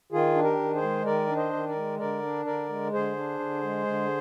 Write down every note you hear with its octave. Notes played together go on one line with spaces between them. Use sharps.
D#3 F4 G#4
D4
G4 A#4
D#3
G#4 C5
G#3
D#3 A#4 D5
D4
C5 D#5
D#3
A#4 D5
G#3
D3 A#4 D5
D4
D3 A#4 D5
G#3
D3 G#4 C5
D4
D3
G#3
D3